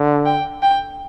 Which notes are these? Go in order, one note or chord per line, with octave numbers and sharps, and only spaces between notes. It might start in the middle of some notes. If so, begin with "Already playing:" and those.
Already playing: D3
G5
G5